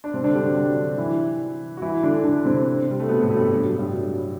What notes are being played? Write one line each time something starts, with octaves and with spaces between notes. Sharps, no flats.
D4
C3 C4
D3 D4
G3 G4
F#3 F#4
D3 D4
E3 E4
F#4
E3 E4
D3 D4
D3 D4
C3 C4
G3
A3
B2 B3
A2 A3
G2 G3
F#3
F#3
G2 G3
F#3